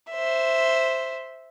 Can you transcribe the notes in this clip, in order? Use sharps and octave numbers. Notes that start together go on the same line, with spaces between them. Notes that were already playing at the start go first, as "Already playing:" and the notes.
C5 E5